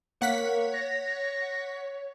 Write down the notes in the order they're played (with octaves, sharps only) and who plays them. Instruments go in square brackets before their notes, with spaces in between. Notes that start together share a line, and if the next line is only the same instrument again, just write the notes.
[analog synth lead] A#3 [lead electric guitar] C#5 [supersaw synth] F#5 B6
[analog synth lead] A#6